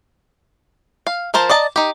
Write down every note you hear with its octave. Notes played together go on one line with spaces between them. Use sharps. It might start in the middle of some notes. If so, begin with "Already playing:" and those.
F5
F3 A#4 C5 A5
D5 D#5 A5 A#5
D#4 G4